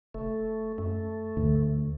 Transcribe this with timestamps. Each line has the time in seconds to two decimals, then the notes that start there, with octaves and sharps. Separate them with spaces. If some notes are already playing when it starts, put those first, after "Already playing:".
0.14 F1 A3
0.78 F#2 A3
1.37 D2 G2